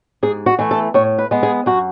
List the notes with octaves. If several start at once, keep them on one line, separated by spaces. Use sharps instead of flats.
G#2 G#4
F#4
E3 A3
A4
A2 C#5
B4
G#3 B3
G#4
F#2 F#4